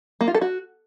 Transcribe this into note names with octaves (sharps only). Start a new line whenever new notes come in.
A#3
F4
A4
F#4